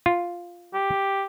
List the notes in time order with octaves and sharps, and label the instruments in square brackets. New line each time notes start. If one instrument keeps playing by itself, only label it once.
[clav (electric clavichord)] F4
[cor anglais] G4